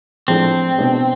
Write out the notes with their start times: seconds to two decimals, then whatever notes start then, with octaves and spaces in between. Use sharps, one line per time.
0.28 A2 F3 G#3 C4 D4
0.78 B2 G#3 D4 G#4